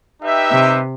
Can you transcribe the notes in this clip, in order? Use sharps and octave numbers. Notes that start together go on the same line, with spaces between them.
D#4 G4 B4 E5 G5
C3